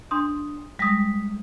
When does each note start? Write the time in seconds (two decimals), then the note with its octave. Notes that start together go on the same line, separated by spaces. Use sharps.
0.11 D4 C6 D#6
0.79 G3 G#3 D#6 A#6 B6